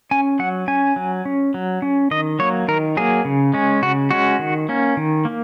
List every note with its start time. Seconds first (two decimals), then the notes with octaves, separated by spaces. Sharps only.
0.11 C#4 G#5
0.39 F#3 F#5
0.68 C#4 G#5
0.96 F#3
1.25 C#4
1.54 F#3
1.82 C#4
2.11 D#3 D#5
2.39 F#3 A#3 C#5
2.68 D#3 A#4
2.97 F#3 A#3 G#4
3.25 C#3
3.54 G#3 C#4
3.82 C#3 F#4
4.11 G#3 C#4 F#4
4.39 D#3
4.69 A#3 C#4
4.97 D#3
5.25 A#3